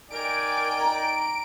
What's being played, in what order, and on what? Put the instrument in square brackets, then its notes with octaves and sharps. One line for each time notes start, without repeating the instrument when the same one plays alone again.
[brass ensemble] D#4 D5 G5 [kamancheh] A#4 G#5 [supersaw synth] D7
[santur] A#5